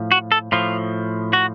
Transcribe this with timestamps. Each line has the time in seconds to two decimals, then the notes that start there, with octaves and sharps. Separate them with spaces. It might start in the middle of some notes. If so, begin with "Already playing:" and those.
Already playing: A2 F3
0.12 F#4
0.32 A4
0.52 A2 F3 F4
1.33 F#4